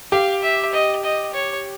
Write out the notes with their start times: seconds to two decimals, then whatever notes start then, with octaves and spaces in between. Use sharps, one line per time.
0.12 G4 F5
0.43 E5
0.73 D#5
1.03 D#5
1.34 C#5